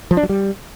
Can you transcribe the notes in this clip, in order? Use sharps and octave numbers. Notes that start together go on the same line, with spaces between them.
F3
D4
F#3
G3